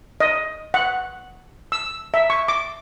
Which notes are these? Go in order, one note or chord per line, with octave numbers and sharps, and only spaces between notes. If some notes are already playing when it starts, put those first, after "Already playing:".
D#5
F#5
E6
E5
C#6
D6